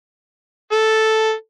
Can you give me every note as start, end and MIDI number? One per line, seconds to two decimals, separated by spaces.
0.72 1.32 69